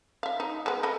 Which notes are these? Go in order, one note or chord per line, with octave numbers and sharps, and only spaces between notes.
E5 F5
D#4
G#3 B3
A4 D#5 B5